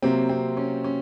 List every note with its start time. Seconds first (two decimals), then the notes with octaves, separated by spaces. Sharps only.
0.02 C3 F#3 A#3 C4
0.29 C4
0.57 C#4
0.84 C#4